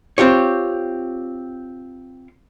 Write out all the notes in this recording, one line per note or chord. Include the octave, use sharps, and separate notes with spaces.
C4 F4 G4 C#5